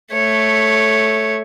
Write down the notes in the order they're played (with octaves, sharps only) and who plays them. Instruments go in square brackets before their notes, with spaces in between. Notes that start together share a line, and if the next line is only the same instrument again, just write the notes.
[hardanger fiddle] A3 C#5